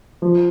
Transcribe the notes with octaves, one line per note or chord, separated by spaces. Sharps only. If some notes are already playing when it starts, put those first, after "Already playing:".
F3